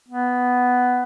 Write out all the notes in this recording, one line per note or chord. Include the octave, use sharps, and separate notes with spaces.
B3